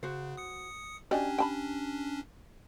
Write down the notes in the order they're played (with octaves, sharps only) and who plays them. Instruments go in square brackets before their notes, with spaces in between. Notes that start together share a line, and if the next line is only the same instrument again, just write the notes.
[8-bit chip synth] C#3 [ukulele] F#4 C5
[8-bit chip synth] D#6 C#7
[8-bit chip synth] C#4 D4 [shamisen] F#4 D5 D#5 [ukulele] G4 G#5
[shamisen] G5 A5 B5